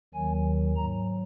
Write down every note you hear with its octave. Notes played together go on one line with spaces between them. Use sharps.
D#2 D#3 F#3 G#5
G#2 F#3 A#5